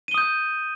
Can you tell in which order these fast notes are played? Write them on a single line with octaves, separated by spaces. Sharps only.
D#7 G7 D#6 G6